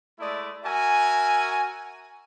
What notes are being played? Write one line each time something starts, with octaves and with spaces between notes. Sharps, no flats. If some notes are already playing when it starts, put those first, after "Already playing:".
G#3 A3 E4 D5 D#6
F#4 A#4 E5 G#5